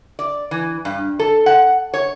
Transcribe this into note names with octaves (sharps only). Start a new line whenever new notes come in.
D5
E3
G2
A4
F#5
C#5